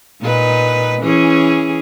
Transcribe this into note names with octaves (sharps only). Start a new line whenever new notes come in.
A#2 D#4 B4
E3 C#4 G#4